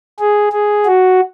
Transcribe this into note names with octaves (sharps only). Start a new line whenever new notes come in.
G#4
G#4
F#4